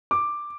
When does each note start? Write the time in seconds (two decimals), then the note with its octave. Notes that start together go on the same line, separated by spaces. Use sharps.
0.11 D6